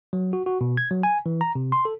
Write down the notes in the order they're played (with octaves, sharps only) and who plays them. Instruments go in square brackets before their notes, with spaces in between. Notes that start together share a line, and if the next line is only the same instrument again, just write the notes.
[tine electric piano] F#3
F#4
F#4
B2
G#6
F#3
G#5
E3
A#5
C3
C6
A4